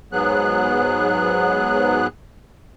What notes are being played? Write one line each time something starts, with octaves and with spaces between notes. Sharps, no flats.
G#2 F#3 B3 G#4 F#6